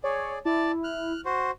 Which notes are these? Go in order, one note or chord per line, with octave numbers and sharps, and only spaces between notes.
G#4 C#5 D5
E4 D5 A5
F6 F#6
F#4 C5